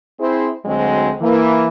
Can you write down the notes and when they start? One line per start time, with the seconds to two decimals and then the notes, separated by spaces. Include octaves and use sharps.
0.20 C4 E4 G#4 C5
0.65 D2 D3 F#3 G#3 C4 F#4
1.22 E3 A#3